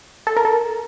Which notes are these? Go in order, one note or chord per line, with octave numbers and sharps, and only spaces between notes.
A4
A#4
A4